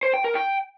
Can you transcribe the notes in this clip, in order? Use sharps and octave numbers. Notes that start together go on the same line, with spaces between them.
C5
G5
A#4
G5